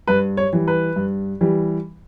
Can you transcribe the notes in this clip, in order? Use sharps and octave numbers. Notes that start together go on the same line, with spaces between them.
G2 B4
C#5
E3 G3
B4
G2
E3 G3